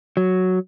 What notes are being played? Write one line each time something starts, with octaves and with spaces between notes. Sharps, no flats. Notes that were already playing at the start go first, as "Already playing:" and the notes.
F#3